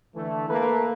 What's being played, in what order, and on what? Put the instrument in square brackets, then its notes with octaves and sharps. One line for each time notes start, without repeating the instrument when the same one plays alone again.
[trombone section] D3 E3 A3
A#3 A4 B4